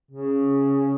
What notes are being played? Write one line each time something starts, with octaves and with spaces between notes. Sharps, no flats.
C#3